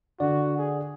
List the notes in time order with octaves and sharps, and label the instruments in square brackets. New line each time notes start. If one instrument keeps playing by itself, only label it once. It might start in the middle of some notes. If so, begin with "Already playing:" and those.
[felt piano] D3 [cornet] F#4 [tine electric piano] D5
[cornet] G#4